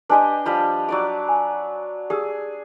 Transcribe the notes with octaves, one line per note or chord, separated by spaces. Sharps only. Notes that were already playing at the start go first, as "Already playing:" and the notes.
D4 G4 B4 D#5 G#5 C6
F3 G3 B5
F#3 D5 D6
G#5
G4 G#4 D#6 E6